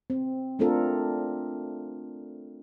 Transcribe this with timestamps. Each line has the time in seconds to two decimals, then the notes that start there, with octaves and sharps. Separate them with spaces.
0.10 C4
0.59 A3 C4 D4 F4 A4 A#4